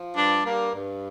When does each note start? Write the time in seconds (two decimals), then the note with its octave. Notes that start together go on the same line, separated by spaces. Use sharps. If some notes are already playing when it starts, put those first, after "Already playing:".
Already playing: F3
0.15 G2 D4
0.45 G2 A#3
0.74 G2